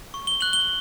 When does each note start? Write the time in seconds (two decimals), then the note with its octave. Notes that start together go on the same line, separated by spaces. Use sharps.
0.14 C#6
0.27 G7
0.41 F#6 F#7
0.53 G7